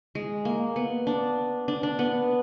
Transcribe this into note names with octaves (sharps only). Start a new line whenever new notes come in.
G#3
A#3
B3
D4
D4
D4
B3